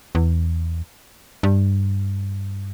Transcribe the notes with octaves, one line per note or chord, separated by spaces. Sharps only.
E2
G2